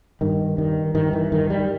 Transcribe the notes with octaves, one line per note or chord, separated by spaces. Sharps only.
G2 D#3
G2 D#3
G2 D#3
E3
G2 D#3
G3